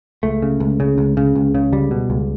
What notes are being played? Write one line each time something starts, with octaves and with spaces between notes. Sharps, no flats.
C#2 A3
C#3
C#2
C#3
C#2
C#3
C#2
C#3
C#2 G3
B2
C#2